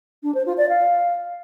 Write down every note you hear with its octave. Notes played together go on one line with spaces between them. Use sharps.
D4
C5
F4
D5
F5